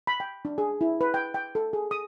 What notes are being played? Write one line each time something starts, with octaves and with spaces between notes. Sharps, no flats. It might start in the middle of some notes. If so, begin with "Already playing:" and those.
B5
G5
D4
G#4
E4
B4
G5
G5
A4
G#4
D#6